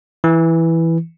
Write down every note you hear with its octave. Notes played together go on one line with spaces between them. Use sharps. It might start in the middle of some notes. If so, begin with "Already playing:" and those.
E3